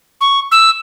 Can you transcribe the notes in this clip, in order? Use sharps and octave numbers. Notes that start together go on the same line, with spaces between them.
C#6
E6